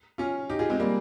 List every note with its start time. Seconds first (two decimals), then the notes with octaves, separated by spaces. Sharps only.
0.18 C#4 F4
0.50 D#4 G4
0.59 F4 G#4
0.70 G#3 C4
0.80 G3 A#3